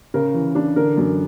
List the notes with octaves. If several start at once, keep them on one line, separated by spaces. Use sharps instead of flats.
C#3 A#4
E3
D4
D3 A#4
F#2